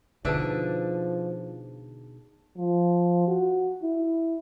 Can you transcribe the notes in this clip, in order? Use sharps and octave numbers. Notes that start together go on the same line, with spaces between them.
B2 D3 F3 D4 D#4 G#4 E5 A5
F3
F#4
E4